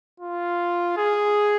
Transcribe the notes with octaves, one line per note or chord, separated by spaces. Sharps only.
F4
G#4